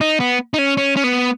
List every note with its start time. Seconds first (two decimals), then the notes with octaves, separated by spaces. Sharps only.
0.01 D#4
0.20 B3
0.54 D#4
0.58 C#4
0.77 C#4
0.97 C#4
1.04 B3